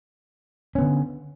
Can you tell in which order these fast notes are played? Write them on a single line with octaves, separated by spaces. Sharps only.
C#4 B3 D3